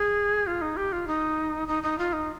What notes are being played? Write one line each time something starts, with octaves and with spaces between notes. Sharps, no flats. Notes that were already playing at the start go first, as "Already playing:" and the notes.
Already playing: G#4
F4
D#4
G4
F4
D#4
D#4
D#4
F4
D#4